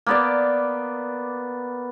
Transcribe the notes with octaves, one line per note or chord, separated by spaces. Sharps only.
A#3 B3 D5